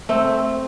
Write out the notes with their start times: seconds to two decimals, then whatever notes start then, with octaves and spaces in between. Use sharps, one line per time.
0.09 A3 C4